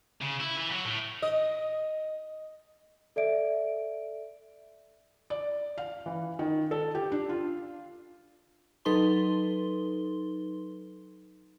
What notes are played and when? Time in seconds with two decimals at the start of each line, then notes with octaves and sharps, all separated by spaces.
0.21 C#3
0.40 E4
0.57 E3
0.71 F#3
0.85 A2
1.22 D#5
3.16 A4 D5 E5 D7
5.30 D5
5.78 F5
6.06 E3
6.39 D#3
6.71 A4
6.95 G4
7.12 D4
7.29 F4
8.85 F#3 D#4 A4 B4 C6 G7